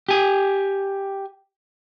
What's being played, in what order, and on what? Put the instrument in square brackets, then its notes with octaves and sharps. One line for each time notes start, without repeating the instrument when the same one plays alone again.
[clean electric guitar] G4 G#5